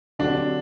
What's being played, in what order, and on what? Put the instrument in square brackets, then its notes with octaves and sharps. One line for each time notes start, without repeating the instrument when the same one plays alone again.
[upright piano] D3 F#3 C4 G4 [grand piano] D4